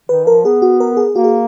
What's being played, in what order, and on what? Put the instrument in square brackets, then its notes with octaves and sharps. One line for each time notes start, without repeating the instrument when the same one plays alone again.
[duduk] D#3 [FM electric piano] B4
[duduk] F3 [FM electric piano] A#4
[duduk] B3 [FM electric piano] G#4
[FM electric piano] F#4
A#4
G#4
[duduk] A#3 [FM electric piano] F#4
[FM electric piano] G#4